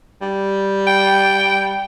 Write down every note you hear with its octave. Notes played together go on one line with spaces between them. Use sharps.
G3
G5